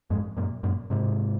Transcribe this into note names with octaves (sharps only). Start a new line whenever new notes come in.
F2 G#2
F#2 A#2
F#2 A#2
G#2 C3